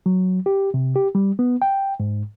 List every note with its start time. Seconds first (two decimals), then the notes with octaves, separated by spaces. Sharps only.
0.06 F#3
0.46 G4
0.74 C3
0.96 G4
1.15 G3
1.39 B3
1.62 G5
2.00 G#2